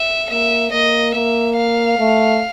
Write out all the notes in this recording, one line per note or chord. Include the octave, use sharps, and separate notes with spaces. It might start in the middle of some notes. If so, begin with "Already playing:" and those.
Already playing: E5
A#3 E5
A#3 D#5
A#3 E5
F5
A3